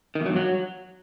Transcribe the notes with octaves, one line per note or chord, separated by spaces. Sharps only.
D#3
E2
F#3
G2
F#3